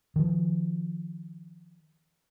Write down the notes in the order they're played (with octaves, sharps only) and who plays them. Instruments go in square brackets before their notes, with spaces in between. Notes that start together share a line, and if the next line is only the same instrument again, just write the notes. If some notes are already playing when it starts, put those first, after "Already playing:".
[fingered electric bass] D#3 F3